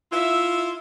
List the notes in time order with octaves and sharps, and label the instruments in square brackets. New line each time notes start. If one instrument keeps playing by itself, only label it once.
[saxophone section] E4 F4 [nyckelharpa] E5